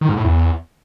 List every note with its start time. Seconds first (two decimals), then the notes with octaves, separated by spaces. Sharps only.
0.01 D#3
0.09 G#2
0.17 A2
0.24 E2